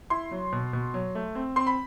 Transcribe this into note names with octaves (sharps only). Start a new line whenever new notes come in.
E4 C6
F#3
B2
B2
F#3
A3
C4
C4 C6
B5